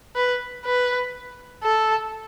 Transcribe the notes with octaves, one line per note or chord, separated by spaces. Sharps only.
B4
B4
A4